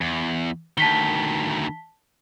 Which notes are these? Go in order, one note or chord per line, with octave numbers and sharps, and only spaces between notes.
E2
D2 D#3 A5 B6 G7